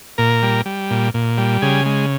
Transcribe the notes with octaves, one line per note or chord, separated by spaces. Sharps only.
A#2 A#4
G3
G3
A#2
A#2
G3
C#3 G#4
G#3